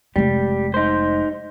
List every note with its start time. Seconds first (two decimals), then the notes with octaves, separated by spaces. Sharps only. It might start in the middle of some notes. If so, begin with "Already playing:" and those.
0.16 F1 G3 G#3
0.74 D#4 C5